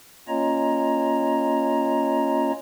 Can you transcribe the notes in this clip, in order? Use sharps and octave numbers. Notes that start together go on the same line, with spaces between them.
A#3 C#4 F4 C#5 D#5 A#5